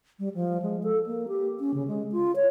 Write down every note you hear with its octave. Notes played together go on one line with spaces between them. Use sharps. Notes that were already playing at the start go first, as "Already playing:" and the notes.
G3
F3
G#3
A4
A#3
G4
C#4
C#3
G#3
F4
C#5